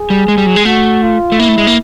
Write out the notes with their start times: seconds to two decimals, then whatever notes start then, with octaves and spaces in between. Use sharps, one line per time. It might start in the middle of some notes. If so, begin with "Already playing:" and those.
Already playing: G#4
0.10 G3
0.28 G#3
0.38 G3
0.46 F#3
0.56 G#3
0.65 A3 F#4
1.02 F4
1.32 A3
1.39 A#3 E4
1.48 A3
1.58 G#3
1.67 A#3